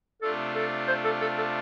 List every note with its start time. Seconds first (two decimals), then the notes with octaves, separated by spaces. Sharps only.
0.22 C3 A3 D4 F4 A4
0.55 A4
0.88 C5
1.05 A4
1.21 A4
1.38 A4